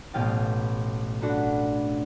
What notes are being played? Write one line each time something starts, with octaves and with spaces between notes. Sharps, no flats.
A1 B2 B3 F5 G5 A6
D4 F#4 A4 B5